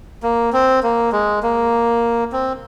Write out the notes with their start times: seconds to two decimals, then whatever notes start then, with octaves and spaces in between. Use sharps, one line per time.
0.23 A#3
0.53 C4
0.83 A#3
1.12 G#3
1.43 A#3
2.32 C4